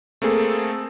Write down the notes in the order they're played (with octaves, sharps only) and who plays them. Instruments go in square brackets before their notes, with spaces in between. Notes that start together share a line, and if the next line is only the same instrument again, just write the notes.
[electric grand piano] A3 A#3 C4 G#4 A4